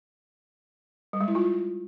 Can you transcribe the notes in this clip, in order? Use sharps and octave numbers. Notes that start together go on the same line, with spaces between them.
G3
G#3
E4
F4